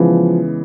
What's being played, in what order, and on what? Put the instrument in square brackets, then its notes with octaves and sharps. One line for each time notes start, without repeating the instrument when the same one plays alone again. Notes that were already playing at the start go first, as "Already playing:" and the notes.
Already playing: [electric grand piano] C#3 E3 G#3 B3 [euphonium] F3